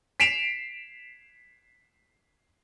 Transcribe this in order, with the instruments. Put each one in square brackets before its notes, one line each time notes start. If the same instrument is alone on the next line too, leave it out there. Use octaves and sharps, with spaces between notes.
[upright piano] B6 C7 D7 E7 F7